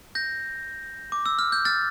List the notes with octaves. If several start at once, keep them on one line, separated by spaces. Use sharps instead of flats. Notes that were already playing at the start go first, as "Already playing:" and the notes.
G6 A#6
D6
E6
F6
G6
F6 A6